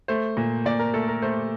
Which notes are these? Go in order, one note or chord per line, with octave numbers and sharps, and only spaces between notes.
A3 C5
A#2
A#2 D5
A#4
A3 A4
A#4
A3 C5